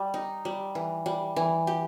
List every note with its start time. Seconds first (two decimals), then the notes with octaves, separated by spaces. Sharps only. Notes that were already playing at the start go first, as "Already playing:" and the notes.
Already playing: G3
0.14 D#4
0.45 G3
0.75 E3
1.06 G3
1.36 E3
1.67 G4